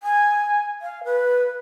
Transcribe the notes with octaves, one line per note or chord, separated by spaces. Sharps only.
G#5
F5
B4